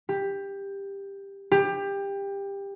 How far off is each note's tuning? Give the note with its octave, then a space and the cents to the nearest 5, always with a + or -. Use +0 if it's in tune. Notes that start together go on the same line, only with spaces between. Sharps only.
G4 +15
G4 +20